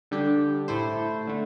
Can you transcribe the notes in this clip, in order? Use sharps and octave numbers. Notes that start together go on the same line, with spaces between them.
D3 G3 D4 G4
A2 A3 E4 C5
D3 A3